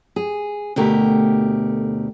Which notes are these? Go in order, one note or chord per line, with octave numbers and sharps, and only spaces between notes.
G#4
D2 B2 A3 G4 A#4